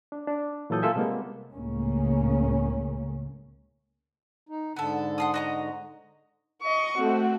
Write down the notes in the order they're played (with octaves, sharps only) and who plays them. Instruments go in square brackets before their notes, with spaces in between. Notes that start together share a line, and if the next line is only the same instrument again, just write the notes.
[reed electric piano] D4
D4
A#2 E3 F#3 A4 D#6 G6
A#3 F4 A4 E5 G#5
C3 G3 G#3 A#3 B3
[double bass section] C#2 A2 C#3 A#3 C#4
[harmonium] D#4
[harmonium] G#2 D3 [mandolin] B3 A4
[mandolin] F#5 C6 D#6
F#4 D#5 A#5
[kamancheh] D#5 C#6
[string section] A3 C4 [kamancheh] F#4